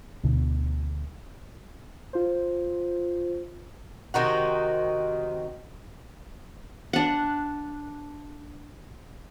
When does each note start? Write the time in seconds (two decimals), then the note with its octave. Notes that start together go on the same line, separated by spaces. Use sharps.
0.24 D2 B2 D3
2.13 F4 C5
4.14 C3 D#3 D#4 F#4
6.93 D4 F#5